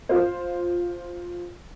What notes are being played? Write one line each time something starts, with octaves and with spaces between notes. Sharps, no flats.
F4 C5